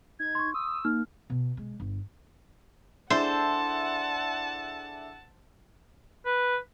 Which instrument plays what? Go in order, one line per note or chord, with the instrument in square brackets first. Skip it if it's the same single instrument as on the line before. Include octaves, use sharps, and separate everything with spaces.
[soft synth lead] D#4 [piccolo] G#6
[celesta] C6 C#6
[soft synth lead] D#6 [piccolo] E6
[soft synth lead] A#3 [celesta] D#4 F6
[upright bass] B2
G#3
G1
[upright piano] D4 E4 G#4 [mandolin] A4 [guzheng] C5 [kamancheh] F#5 A5
[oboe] B4